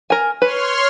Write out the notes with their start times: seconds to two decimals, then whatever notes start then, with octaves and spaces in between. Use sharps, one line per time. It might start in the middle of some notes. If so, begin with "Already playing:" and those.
0.10 A#4 G#5
0.42 B4 C#5 C6 F6